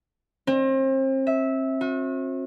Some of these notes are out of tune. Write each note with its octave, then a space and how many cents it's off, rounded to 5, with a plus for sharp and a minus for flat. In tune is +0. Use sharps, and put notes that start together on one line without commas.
C4 +35
E5 -15
F#4 -40